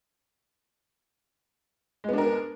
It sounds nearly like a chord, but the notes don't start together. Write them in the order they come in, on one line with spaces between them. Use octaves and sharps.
G#3 B3 D4 A#4